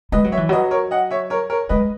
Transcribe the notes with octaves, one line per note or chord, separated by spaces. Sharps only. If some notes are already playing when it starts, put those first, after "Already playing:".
G#3 B4 D#5
F#3
C#5 E5
E3
F#3 B4 D#5
A#4 C#5
D#5 F#5
C#5 E5
A#4 C#5
A#4 C#5
G#3 B4 D#5